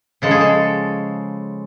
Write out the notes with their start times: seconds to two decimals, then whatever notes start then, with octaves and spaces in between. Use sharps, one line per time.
0.22 C#3 F3 G#3 A4
0.31 G#4
0.41 A4